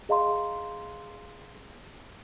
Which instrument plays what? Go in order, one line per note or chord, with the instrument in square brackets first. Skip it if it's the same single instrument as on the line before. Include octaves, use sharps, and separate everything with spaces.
[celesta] G#4 D#5 F5 A#5 C6